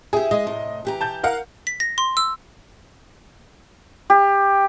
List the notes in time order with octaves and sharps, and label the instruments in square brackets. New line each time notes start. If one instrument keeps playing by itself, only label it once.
[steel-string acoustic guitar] E4 G4 [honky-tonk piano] G#4
[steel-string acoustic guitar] G#3 [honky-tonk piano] D#5
[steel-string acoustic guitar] A2 C3
E3 G4 A#5
[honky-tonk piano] A5 G6
A#4 F5 F#5
[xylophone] B6
A#6
C6
E6
[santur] G4